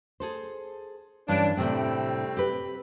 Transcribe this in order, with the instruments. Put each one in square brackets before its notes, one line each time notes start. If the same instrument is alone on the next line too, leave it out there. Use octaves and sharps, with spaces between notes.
[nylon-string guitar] G#4 A4 C5
[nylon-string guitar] G2 E3 C#4 [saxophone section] D4
[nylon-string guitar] A2 C3 E4 [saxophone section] G3 A3 C4
[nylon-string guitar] G4 B4